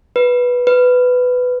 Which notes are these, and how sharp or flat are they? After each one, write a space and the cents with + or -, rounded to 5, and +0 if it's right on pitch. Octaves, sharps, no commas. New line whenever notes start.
B4 -10
B4 +10